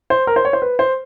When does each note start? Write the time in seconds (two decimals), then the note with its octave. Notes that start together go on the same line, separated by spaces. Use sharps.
0.10 C5
0.27 A#4
0.36 C5
0.45 C#5
0.53 C5
0.62 B4
0.79 C5